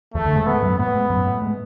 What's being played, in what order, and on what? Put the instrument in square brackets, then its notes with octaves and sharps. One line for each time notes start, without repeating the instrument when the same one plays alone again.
[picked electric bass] E2 [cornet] A3
[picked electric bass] D2 D3
G#2 G#3
[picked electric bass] G#2 G#3 [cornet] B3
[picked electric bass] F#2 F#3
[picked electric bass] A2 A3 [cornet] B3
[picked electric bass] G#2 G#3
F#2 F#3
A2 A3
G#3